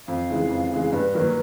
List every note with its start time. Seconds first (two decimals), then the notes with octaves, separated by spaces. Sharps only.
0.08 F2 F5
0.29 C#3 E3 G#3
0.50 F2
0.71 C#3 E3 G#3
0.93 G2 B4
1.14 D#3 F#3 A#3